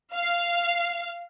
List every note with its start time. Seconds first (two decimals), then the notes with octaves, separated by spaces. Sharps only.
0.14 F5